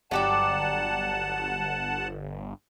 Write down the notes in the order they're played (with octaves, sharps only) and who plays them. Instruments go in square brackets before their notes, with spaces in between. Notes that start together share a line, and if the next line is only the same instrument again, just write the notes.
[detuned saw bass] G1 [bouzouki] F#3 G4 D5 [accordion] F#5 A5